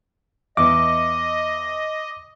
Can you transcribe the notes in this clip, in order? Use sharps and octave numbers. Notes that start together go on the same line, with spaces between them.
E2 D#5 D6